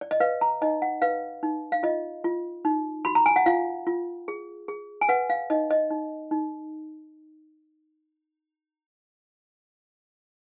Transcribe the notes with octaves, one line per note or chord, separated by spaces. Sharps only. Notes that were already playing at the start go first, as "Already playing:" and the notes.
D5
D#5
B4 F5
A#5
D#4 D#5
F#5
B4 F5
D#4
F5
F4 D#5
F4
D#4
F#4 B5
A#5
G#5
F#5
F4 F5
F4
G#4
G#4
G#5
B4 F#5
F5
D#4 D#5
D#5
D#4
D#4